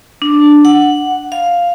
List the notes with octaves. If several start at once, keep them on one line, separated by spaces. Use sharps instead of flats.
D4
F#5
F5